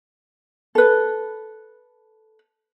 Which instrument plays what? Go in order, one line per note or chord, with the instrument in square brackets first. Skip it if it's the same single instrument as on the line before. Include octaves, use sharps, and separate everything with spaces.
[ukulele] A4 B4